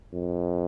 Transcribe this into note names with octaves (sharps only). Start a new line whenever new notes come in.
F2